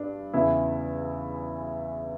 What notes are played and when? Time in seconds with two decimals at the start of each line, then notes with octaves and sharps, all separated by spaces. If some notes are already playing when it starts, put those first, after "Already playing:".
Already playing: G2 D4
0.33 E2 C#3 E3 E4